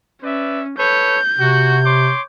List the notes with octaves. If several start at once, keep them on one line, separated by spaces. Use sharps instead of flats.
C#4 B4 D5 E5
A4 B4 C#5 G6
C3 F#4
C#5 C6 D6